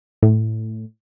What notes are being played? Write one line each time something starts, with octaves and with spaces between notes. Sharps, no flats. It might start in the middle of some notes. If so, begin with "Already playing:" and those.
A2